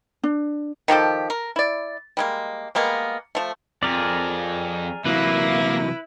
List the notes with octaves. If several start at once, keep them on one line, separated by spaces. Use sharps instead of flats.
D4
D#3 F3 G4 A4
A#4
E4 D5
G3 G#3 A#3
G3 G#3 A#3 B3
F3 A3
F2 G#4 A#4 D5
C3 E3 F#3 A#3 E4 B4